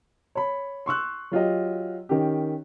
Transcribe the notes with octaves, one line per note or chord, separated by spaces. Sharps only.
C#5 B5
C6 C#6 E6 F#6
F#3 F4 G4 D#5
D#3 C#4 G4